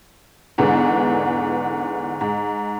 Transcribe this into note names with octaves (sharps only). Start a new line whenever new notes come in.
E2 G#2 D3 B3 D4
G#2